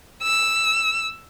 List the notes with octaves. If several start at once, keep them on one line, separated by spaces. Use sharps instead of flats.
E6